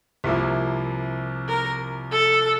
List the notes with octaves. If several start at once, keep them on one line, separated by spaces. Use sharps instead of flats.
C2 C3 F3 A#3 E4
A#4
A4